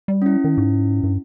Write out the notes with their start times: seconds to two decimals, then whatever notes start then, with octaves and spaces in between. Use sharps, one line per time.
0.08 G3
0.22 C#4 E4
0.44 D#3
0.58 G#2
1.03 G2